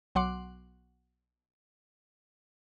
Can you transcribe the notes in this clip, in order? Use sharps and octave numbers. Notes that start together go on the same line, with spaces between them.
B1 F#3 F#5 C6 D6